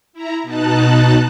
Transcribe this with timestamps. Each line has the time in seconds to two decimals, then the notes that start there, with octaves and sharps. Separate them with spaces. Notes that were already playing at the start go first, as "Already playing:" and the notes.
0.13 E4 A#5
0.43 B2 D#4 A5 F#6